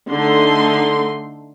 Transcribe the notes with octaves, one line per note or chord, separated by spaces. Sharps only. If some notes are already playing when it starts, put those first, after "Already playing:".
D3 A3 D#4 C6